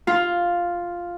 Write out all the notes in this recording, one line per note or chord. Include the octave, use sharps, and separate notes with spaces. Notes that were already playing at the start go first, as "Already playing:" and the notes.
F4